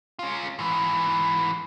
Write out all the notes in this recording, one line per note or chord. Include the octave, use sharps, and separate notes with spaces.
C#4 F4
G#2 E3